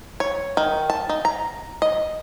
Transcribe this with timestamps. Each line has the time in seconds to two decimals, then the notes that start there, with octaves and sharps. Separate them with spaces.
0.20 C#5
0.57 D#3
0.90 A5
1.09 D#4
1.25 A#5
1.82 D#5